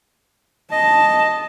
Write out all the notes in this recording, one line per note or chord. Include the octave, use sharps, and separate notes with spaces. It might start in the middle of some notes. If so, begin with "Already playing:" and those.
D#5 A5